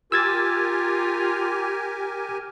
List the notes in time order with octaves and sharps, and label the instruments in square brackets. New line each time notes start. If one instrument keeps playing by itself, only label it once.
[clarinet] F4 [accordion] G4 A#4 G#5 [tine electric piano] E6 G#6 A6